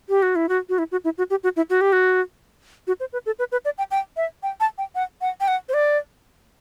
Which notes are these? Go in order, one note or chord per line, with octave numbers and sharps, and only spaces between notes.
G4
F#4
E4
F#4
F#4
E4
F#4
E4
F#4
G4
F#4
E4
F#4
G4
F#4
F#4
C5
B4
A4
B4
B4
D5
G5
G5
E5
G5
A5
G5
F#5
F#5
G5
F#5
C5
D5